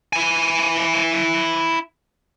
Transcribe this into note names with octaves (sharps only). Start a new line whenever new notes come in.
E4 G#5